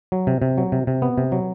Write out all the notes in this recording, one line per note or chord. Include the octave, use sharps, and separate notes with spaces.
F#3
C3
C3
F#3
C3
C3
B3
C3
F#3